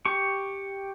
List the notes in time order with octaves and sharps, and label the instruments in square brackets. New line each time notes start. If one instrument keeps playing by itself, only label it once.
[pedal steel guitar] G4 C#6